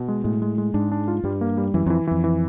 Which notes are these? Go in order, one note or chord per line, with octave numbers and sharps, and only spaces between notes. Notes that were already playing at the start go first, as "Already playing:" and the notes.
Already playing: B2
G#3
A2 G#3
G#3
G#3
G#2 D4
D4
F4
G2 G3
A#3
G3
F#2 E3
F2 E3
F2 E3
E3